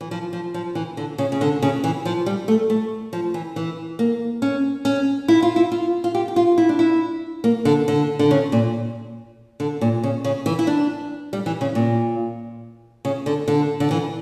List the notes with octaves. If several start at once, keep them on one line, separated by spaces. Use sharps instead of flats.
E3
F3
F3
F3
E3
D3
C#3
C#3
D3
C#3
E3
F3
G3
A3
A3
F3
E3
E3
A#3
C#4
C#4
E4
F4
E4
F4
F4
G4
G4
F4
E4
D4
E4
A#3
D3
D3
D3
C#3
A#2
D3
A#2
C#3
C#3
E3
E4
D4
G3
E3
C#3
A#2
C#3
D3
D3
D3
E3